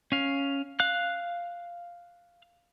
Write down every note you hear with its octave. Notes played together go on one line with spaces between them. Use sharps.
C#4 F5
F5 F#6